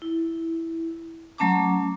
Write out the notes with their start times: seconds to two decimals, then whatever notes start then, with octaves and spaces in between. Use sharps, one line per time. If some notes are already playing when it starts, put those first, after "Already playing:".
0.02 E4
1.38 F#3 A3 C#4 A5 A#5 D6